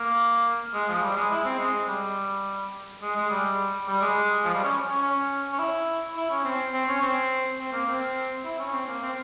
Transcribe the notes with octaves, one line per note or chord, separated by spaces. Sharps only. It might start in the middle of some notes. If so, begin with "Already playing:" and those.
Already playing: A#3
G#3
F3
G3
G#3
E4
C4
G#3
G3
G#3
G#3
G3
G3
G#3
F3
G3
C#4
C#4
C#4
C#4
E4
E4
C#4
C4
C4
C#4
C4
C4
A#3
C4
E4
C#4
C4
A#3
C4